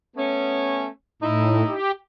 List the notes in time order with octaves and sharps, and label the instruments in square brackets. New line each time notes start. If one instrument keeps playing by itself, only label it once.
[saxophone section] A3 B3 C#4
[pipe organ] A2 [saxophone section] D#4 E4
[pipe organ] G4